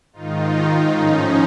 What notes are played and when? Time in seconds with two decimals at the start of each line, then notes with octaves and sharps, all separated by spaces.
0.13 G#2 D#3 D#4 F4
0.95 A2 F3 C#4 D#4